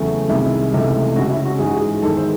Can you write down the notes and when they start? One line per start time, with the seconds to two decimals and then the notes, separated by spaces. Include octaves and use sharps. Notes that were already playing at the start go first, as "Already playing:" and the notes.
Already playing: E2 C#3 F#3 A3
0.29 C2 C3 D#3 G#3 E4
0.72 C#2 C3 E3 A3
1.16 C#2 C#3 G#3 F#4
1.30 E4
1.45 F#4
1.59 G#2 E3 G#3 G#4
1.66 F#4
1.74 G#4
2.02 E2 D#3 G#3 A4
2.17 C5